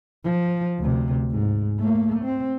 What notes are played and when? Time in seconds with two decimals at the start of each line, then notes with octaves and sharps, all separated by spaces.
0.24 F3
0.79 D2 C3
1.31 G#2
1.79 A3 A#3
2.24 C4